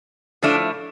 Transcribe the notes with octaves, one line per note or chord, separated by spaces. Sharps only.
A2 F3 A3 D4